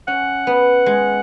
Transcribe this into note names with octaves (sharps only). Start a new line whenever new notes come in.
C#4 F#5
B3
G#3